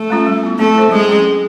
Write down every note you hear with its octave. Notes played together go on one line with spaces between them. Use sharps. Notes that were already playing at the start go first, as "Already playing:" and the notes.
Already playing: A3
G#3 C#4 F4
G3
B3 E4
A3 C4
E4 A4 C5
F#3 G#3
A3 C#4
F#3